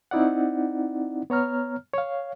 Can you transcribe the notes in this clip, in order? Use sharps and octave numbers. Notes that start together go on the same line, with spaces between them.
C4 D#4 E4 D5 F#5
B3 C#5 A#5 F6
C#5 F5